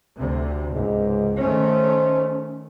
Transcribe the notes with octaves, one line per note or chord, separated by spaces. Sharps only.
D2 C3
C#2 G#2
D#3 A3 C#4 C5